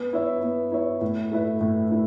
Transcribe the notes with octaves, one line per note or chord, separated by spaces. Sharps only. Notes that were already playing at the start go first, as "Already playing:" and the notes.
Already playing: B3
E4 C#5 E5
B3
E4 C#5 E5
A2
A3 E4 B4 E5
A2
A3 E4